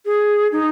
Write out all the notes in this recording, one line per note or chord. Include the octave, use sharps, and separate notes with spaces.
G#4
D#4